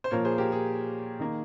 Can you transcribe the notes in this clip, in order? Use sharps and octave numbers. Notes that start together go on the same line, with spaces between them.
C5
A#2 F3 A#3 A#4 C#5
G#4 C5
G4 A#4
G#4
D#3 A#3